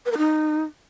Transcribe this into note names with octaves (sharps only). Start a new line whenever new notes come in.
B4
A#4
D#4